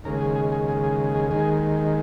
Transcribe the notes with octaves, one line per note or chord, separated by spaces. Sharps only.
D#2 C#3 G#3 A#4
G#4
G#4
G#4
G#4
G#4
G#4
D#2 D#3 G#3 G#4